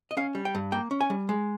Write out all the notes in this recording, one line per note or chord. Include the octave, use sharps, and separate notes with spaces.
D#5
C#4 F5
G3
G5
G2
A#3 G5
C#4
G#5
G3
G#3